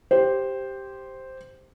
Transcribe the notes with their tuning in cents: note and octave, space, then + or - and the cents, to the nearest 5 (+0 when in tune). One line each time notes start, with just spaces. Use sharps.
G4 +0 C5 +0